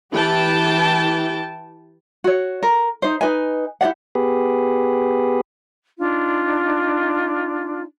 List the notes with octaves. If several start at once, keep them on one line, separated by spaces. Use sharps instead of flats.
E3 G4 G5 A5
F#4 C#5
A#4
D#4 C5
D#4 B4 D#5 G#5
E4 G4 D5 F#5
B3 G4 G#4 B4
D4 D#4 F4